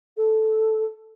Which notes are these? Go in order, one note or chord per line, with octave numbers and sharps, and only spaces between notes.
A4